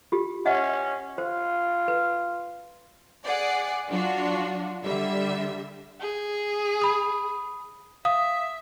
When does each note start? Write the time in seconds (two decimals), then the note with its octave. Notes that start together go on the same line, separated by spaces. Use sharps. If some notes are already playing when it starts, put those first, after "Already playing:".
0.12 F4 G4
0.46 C#4 D#5 E5 F#5
1.18 F4 C5
1.88 B4
3.24 G#4 D5 F#5
3.87 F#3 D4 F4 F#4
4.82 D3 G3 E5
6.00 G#4
6.82 B5 D#6
8.05 E5 F5 D#6